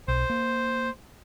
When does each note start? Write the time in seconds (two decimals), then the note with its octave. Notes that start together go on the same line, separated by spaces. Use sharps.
0.08 B1 C5
0.30 A#3